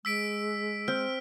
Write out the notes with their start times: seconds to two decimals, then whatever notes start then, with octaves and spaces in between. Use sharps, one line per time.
0.05 G#3 E6 B6 D7
0.88 C4 F6